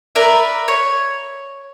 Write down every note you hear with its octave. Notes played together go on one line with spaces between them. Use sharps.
A#4 B4 D5 E5
C#5